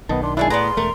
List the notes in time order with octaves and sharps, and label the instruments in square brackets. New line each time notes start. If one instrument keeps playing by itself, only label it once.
[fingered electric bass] B1 D#3 [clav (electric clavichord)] B3 D#5 A5
[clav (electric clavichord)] D4 [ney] C6
[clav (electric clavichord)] G#3 E4 [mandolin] D4 F#4 G#4 [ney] D5
[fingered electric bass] A2 [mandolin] B3 D5 A#5 [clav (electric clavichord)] G#4 B4 [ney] C6
[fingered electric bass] E1 A3 [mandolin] A#4